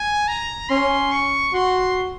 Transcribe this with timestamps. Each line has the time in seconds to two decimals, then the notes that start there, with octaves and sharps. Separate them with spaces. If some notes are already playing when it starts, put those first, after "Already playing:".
Already playing: G#5
0.28 A#5
0.69 C#4 C6
1.12 C#6
1.53 F#4 C6